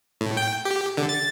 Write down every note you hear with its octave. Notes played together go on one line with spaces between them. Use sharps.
A2
G5
G4
D3
A6